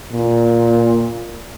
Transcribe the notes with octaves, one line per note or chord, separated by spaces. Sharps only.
A#2